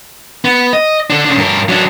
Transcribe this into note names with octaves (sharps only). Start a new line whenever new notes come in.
B3
D#5
D3 D4
C#3 D4
G2 A#4
F#3 D4